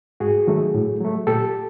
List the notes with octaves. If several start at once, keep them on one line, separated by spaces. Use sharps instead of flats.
G#2 F#4 G#4
D#3 F#3 A3
A2
F#3 A3
A#2 G4 A4